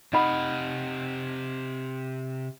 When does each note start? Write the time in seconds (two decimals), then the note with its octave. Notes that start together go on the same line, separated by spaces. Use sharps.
0.13 C3 D#4 F5 F#5 B5